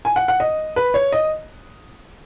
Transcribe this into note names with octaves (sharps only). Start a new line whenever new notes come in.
G#5
F#5
F#5
D#5
B4
C#5
D#5